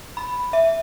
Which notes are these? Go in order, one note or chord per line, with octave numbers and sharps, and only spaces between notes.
B5
E5